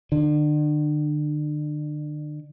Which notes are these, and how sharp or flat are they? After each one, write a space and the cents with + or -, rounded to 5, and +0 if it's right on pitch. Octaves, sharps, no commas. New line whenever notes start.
D3 +35